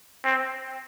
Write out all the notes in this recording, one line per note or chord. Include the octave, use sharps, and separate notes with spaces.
C4